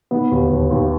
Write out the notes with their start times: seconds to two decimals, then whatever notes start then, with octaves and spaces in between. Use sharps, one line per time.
0.11 D#3 B3
0.32 D#2
0.51 D#2
0.71 D#2